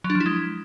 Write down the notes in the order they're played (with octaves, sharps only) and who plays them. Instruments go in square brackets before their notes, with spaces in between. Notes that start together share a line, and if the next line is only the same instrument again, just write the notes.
[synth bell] F#3
D4
F3
E4
G#3